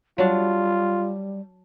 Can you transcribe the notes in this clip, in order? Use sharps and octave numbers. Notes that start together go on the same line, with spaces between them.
F#3 G3 D4 F4